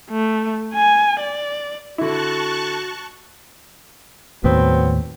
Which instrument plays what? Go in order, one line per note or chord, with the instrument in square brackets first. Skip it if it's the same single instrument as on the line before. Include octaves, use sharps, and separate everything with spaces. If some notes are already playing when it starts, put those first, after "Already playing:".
[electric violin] A3
G#5
D5
[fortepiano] D3 E4 [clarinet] F#4 [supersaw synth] A5 C#6 F#6
[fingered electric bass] D#2 A2 [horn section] F#3 B3 C4